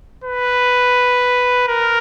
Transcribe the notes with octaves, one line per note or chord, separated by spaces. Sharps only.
B4
A#4